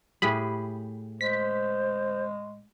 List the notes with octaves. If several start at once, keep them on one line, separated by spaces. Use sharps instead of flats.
A2 G4 G#4 B5
G#3 C5 B6